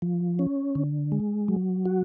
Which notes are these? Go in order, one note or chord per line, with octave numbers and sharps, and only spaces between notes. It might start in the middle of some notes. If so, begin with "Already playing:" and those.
F3
C#4
D3
G#3
F#3
F#4